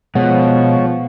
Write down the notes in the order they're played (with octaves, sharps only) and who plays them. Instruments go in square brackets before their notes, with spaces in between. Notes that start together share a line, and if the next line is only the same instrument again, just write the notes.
[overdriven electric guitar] B2 [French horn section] F3 [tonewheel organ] G#3 C#5 [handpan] B3 F#5